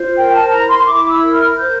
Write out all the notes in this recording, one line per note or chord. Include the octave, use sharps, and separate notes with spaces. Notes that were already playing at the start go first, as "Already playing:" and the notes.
Already playing: F4 C5
A#4 G5
A5
E4 A#5
C6
E4 D6
E6
A#4
F6
C5 G6